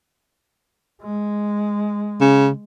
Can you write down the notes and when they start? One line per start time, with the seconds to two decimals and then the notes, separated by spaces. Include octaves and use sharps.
1.02 G#3
2.21 C#3